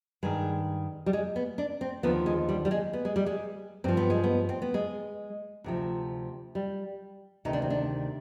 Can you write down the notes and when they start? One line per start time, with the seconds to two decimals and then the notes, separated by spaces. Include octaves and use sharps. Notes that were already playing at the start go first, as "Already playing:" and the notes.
0.23 G2 D#3 G#3
1.06 G3
1.13 G#3
1.36 B3
1.58 D4
1.81 C4
2.03 D#2 D3 F3 B3
2.26 G#3
2.49 G3
2.65 G3
2.71 G#3
2.93 B3
3.05 G#3
3.16 G3
3.26 G#3
3.84 G2 F3 C4
3.97 B3
4.10 G#3
4.24 B3
4.49 C4
4.62 B3
4.74 G#3
5.64 D2 C3 F3
6.55 G3
7.45 D2 C3 D#3 D#4
7.53 D4
7.62 C4
7.70 D4